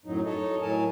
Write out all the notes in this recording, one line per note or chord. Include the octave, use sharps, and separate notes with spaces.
F#2 A2 F#3 D#4
D#4 A4 C#5 D#5
A2 F#3 A#4 G#5 A5